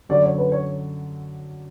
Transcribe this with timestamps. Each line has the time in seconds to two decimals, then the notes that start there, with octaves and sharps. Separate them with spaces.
0.09 F#2 D3 F#3 D5
0.23 C#5
0.38 B4
0.52 C#5